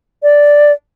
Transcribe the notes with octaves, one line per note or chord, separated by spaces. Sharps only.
D5